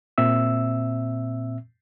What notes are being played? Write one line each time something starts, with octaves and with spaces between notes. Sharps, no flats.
A#2 C4 E5 E6